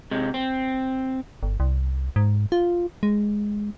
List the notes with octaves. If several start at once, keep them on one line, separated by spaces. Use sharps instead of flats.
C3 G#3
C4
G1
C2
G#2
F4
G#3